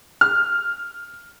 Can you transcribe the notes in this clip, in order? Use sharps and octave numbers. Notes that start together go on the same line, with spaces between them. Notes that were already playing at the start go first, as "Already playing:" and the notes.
F6